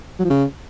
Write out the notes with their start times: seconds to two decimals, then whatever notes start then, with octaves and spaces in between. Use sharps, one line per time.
0.19 F#3
0.25 F3
0.30 C#3